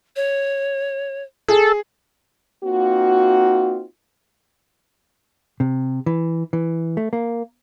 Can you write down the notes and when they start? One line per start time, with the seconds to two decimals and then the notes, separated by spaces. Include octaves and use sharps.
0.16 C#5
1.48 G#4 A4
2.64 A#3 C4 D#4 F4 F#4
5.60 C3
6.06 E3
6.53 E3
6.97 A3
7.13 A#3